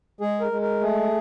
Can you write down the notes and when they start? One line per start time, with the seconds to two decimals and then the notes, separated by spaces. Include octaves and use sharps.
0.21 G#3 G#4
0.41 A#4
0.52 G#3
0.62 A#4
0.81 A3 G#4